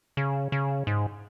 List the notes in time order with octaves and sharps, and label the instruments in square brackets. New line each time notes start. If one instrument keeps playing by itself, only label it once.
[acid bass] C#3
C#3
G#2